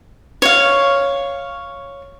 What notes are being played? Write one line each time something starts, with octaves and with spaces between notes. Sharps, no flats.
C#5 F5